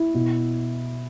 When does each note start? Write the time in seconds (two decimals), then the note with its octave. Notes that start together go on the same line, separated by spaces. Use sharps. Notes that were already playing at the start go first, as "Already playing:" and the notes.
Already playing: E4
0.15 B2